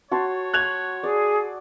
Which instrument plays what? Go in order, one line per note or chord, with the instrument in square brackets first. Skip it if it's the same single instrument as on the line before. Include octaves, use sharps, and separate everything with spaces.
[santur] F#4 A5 C6 [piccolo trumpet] C#5
[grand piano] F#6 G#6 F7
[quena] G#4 [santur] D5